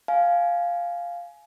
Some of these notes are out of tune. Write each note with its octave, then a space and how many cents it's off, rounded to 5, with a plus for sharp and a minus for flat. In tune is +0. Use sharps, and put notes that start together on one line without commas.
F5 +0 G#5 +20